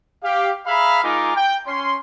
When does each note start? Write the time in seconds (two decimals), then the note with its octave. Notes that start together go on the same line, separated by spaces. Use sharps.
0.24 G4 F5
0.67 G#4 E5 F5 A#5 B5
1.03 G#3 D#4 F4 A#4 G#5 D6
1.36 G5
1.67 C#4 C6